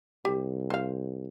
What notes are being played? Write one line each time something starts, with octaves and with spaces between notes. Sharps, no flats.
C2 G4
C5 F5